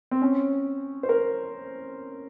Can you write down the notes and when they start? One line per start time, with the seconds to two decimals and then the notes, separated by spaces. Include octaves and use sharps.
0.11 C4
0.22 C#4
1.03 C5
1.09 A#4